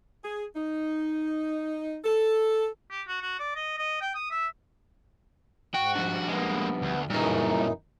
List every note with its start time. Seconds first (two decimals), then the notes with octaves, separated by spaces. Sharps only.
0.22 G#4
0.55 D#4
2.05 A4
2.91 G4
3.08 F#4
3.22 F#4
3.39 D5
3.56 D#5
3.78 D#5
4.01 G5
4.15 D#6
4.31 E5
5.74 G#2 F#4 G5
5.95 F3 G3 D4
6.28 G#3 A#3 B3
6.82 D2
7.10 F#2 A#2 C#3 E3 G3 D#4 A#4